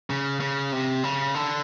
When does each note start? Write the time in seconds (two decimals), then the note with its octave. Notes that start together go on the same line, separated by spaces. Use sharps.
0.10 C#3
0.40 C#3
0.72 C3
1.04 C#3
1.35 D3